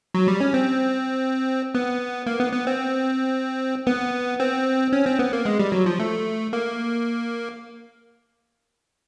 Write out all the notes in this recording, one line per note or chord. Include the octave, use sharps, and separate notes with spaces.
F#3
G3
C#4
C4
B3
A#3
B3
B3
C4
B3
C4
C#4
C4
B3
A#3
G#3
G3
F#3
F3
A3
A#3